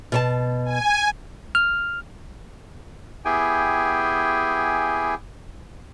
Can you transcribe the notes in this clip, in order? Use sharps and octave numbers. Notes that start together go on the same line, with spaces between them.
B2 C#5 A5
G#5
F6
B3 E4 G4 G#4 G5 G#5